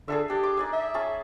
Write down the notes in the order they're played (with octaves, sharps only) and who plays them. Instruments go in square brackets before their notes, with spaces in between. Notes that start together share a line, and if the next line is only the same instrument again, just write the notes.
[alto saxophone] D3 [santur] G#4 A4 E5
[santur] D4 [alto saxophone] G4
[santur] D6
D#4 D5 G#5
[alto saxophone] E5
[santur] C#4 G#4 A5